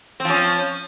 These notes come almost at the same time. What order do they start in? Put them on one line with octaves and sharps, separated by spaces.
C4 F3 C#4